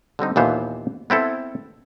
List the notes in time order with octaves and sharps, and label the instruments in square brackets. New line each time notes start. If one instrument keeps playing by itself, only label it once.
[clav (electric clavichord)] D3 G3 C4 D#4
D#2 A#2 E3 B3 C5 F5
B3 C4 E4 A4